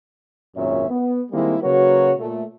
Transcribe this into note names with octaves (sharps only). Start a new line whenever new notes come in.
G#1 F#2 A#2 C#4 C#5 E5
B3
D#3 G3 G#3 A#3 C4 E4
C#3 F#3 A#3 F#4 B4 C#5
A#2 A3